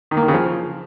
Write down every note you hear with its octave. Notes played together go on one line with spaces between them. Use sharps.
D#3
A#3
D#3
C#3
F3